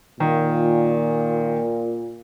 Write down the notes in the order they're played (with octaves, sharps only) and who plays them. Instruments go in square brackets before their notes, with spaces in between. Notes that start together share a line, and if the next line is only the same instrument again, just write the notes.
[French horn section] A#2 [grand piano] D#3